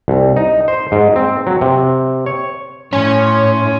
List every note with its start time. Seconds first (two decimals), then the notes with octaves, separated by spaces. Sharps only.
0.08 C2
0.36 D#4
0.68 C5
0.92 G#2
1.16 C4
1.47 F#3
1.61 C3
2.26 C#5
2.93 A2 C#4 C#5 C6